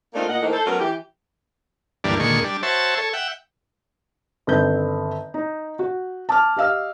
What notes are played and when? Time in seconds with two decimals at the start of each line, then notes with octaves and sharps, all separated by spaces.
0.14 A3 A#3 C4 D4 D#4 F4
0.28 A#2 D#5 F#5
0.42 E3 A3 A#3 C4 D#4
0.53 A4 C5
0.66 F#3 A3 B3 C#4 A#4
0.80 E3 G4
2.04 D2 G2 E3 G3 A#3 D4
2.20 D#2 A#2 D3 G#3 C#6
2.44 G3 D4
2.63 F#4 C5 C#5 E5 A5
2.97 A4 C#5
3.13 E5 F#5 G5
4.47 G1 D#3 C4 G6
5.34 D#4
5.79 F#4
6.29 A5 D6 F6
6.56 G4 D#5 F5 E6 F6